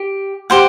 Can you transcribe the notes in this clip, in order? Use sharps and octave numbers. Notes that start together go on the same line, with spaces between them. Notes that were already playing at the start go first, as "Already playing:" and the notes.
Already playing: G4
G4 C5 F#5